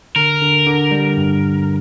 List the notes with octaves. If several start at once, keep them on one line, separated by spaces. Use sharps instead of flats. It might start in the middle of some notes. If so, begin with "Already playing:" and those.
D3 A#4
D3
D3
G3
G2